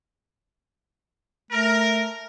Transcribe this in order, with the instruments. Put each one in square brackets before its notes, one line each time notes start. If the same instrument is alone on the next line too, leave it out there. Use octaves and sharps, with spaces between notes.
[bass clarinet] A3 [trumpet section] A#4